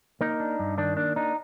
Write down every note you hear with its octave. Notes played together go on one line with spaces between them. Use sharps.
A#3 D#4
D4
G2
D#3 D4
A#3 D4
D4 D#4